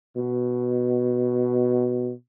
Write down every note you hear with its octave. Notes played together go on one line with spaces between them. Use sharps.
B2